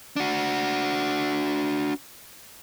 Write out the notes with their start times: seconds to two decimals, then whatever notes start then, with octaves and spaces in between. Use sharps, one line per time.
0.16 D4 F#4